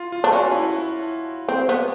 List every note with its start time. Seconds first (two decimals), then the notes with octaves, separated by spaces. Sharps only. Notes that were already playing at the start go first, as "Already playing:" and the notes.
Already playing: F4
0.12 F4
0.24 D4
0.32 C#4 F#4
0.51 E4
1.49 C4
1.69 B3